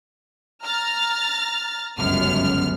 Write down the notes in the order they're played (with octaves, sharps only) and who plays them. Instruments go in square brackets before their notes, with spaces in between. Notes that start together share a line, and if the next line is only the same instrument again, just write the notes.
[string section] A#5 F6 A6
G1 C#2 F#2 B3 F6